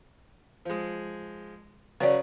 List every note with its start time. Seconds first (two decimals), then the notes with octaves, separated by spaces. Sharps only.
0.65 F3 G#3
2.00 C#3 F#3 B4 C#5 D5